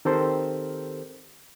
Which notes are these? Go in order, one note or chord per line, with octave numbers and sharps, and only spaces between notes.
D#3 C4 G4 A4 A#4 C5